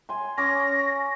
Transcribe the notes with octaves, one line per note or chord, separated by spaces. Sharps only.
G#5 C6
C#4 D6 A#6